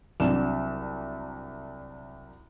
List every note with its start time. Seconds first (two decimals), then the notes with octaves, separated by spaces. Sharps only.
0.20 C2 F#3 D4 E7